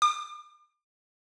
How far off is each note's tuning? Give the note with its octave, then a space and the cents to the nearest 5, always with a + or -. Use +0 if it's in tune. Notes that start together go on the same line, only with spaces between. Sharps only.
D6 +40